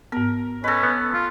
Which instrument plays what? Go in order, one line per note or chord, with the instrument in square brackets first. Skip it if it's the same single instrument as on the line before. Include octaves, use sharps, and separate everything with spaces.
[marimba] G#2 B3 [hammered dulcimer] A#4
[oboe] C#4 [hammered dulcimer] A4 B4 [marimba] D#5 A#6
[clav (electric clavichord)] B3
[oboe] F4